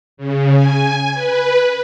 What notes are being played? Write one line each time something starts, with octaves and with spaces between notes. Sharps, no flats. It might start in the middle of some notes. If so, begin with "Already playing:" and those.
C#3
G#5
B4